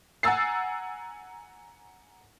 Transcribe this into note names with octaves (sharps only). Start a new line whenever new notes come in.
F#5 G#5 A#5 E6 A6 C7